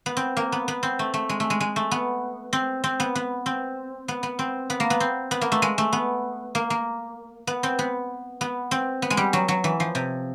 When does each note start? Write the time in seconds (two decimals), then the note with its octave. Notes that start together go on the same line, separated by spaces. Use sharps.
0.06 B3
0.17 C4
0.37 A#3
0.52 B3
0.68 B3
0.83 C4
0.99 A3
1.14 A3
1.29 G#3
1.40 A3
1.50 G#3
1.60 G#3
1.76 A3
1.91 B3
2.53 C4
2.84 C4
3.00 B3
3.15 B3
3.46 C4
4.08 B3
4.23 B3
4.39 C4
4.70 B3
4.80 A#3
4.90 B3
5.00 C4
5.31 B3
5.41 A#3
5.52 A3
5.62 G#3
5.78 A3
5.93 B3
6.55 A#3
6.70 A#3
7.47 B3
7.63 C4
7.79 B3
8.41 B3
8.71 C4
9.02 B3
9.10 G#3
9.17 G3
9.33 F#3
9.48 F#3
9.64 E3
9.80 F3
9.95 C3